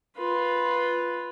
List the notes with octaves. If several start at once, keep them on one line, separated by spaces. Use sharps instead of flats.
F4 B4